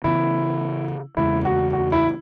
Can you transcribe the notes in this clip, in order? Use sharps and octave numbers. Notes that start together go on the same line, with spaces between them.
C#3 E3 B3 E4
E2 C#3 G#3 E4
F#4
F#4
E4